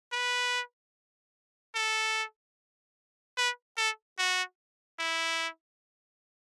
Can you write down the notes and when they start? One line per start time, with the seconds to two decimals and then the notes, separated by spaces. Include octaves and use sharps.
0.13 B4
1.75 A4
3.37 B4
3.78 A4
4.18 F#4
4.99 E4